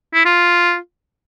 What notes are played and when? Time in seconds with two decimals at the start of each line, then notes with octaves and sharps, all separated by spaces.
0.14 E4
0.25 F4